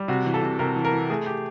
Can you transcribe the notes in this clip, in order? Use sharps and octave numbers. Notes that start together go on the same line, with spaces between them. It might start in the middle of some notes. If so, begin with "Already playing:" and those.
Already playing: G3
C3 F#4
E3
A4
C3
C3 A#4
E3
A#4
E3
A3 G#4
G4